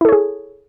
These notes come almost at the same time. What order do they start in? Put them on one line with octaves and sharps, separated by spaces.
E4 A4 C#5 G#4